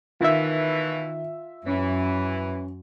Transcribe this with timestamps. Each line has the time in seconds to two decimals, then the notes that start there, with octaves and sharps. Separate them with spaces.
0.21 B2 D#3 E3 F4 E5
1.66 F#2 E3 C#4